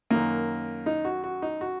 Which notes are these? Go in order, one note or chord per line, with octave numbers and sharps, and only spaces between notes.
F#2 D#3 A#3
D#4
F#4
F#4
D#4
F#4